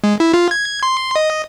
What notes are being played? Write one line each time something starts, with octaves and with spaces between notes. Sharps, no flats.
G#3
E4
F4
G#6
C6
D#5